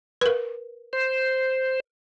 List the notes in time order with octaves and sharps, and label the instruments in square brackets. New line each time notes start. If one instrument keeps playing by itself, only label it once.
[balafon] A#4 B4
[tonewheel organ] C5